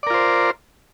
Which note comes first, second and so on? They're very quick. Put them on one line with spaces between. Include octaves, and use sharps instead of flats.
D5 A#4 F4 C5